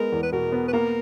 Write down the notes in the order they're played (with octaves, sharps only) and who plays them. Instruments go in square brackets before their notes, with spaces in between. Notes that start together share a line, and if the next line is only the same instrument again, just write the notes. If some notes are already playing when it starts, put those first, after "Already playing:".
Already playing: [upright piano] G#3 B3 [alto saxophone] A#4
[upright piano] E2
[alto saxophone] B4
[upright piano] B2 [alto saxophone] A#4
[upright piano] B3
[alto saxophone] B4
[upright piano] A#3 [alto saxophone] A#4